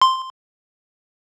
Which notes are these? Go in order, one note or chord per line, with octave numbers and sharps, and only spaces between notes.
C6